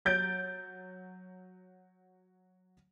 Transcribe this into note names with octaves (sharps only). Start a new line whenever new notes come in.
F#3 G6 A6 D7